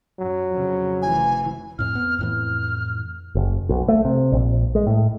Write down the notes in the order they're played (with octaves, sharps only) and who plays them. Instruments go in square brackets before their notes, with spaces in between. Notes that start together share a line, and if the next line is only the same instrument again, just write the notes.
[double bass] F#2 [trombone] F#3
[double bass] F2 C#3
[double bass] F1 E3 [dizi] G#5
[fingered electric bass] F2 A2 [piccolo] F6
[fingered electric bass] B3
[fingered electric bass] F2 A2 E3 [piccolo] F6
[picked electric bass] F#1
B1
A3
C3
A#1
G#3
A2